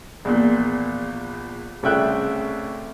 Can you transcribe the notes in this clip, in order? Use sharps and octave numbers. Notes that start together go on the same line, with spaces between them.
A#1 E2 A#2
C2 C#3 A3 E5 G5 F#6